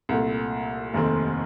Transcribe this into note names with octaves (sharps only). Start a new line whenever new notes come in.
C2 A#2 A3
F1 D#2 D#3 A3 C4